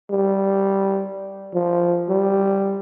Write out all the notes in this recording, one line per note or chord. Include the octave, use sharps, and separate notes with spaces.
G3
F3
G3